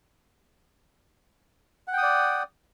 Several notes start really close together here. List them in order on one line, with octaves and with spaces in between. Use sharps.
F#5 G5 D#6 D5